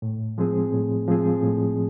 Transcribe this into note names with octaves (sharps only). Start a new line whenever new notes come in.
A2
F3 G#3 C4 G#4
A2
F3 G#3 C4 G#4
A2